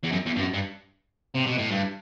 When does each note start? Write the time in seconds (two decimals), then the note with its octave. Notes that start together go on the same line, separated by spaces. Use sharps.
0.04 E2
0.12 F#2
0.26 E2
0.36 G2
0.41 F#2
0.54 G2
1.35 C3
1.46 B2
1.58 A2
1.70 G2